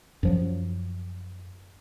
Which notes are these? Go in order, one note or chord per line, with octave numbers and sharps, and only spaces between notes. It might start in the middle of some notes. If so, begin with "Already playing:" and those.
F#2 F3 F#3